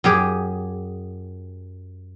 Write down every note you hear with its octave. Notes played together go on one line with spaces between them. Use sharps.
F#2 G4 G#4